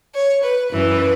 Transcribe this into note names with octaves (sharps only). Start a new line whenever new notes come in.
C#5
B4
F#2 E3 B4